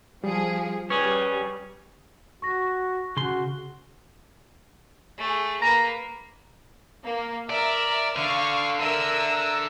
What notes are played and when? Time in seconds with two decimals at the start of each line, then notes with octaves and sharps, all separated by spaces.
0.24 F3 G3 G#4
0.90 G3 C#4 G#4 B4 C#6
2.42 F#4 C#6 A#6
3.17 C#3 F#4 C6
5.18 A3 G#4
5.62 A#3 B4 A#5
7.05 A#3
7.50 A#4 D5 E5
8.17 D3 F5 C#6
8.80 D3 A#4 E5 E6